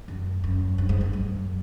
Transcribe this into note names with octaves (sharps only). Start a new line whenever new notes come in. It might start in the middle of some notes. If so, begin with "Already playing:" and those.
F#2
F#2
G2
G#2
G2
F#2